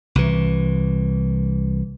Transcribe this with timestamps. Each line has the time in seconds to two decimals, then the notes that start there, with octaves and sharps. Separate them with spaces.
0.15 C2 E3